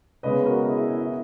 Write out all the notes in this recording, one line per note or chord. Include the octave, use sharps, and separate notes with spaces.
C#3 G#3 B3 B4 D#5
F#4 A#4
E4 G#4
E4
E4
E4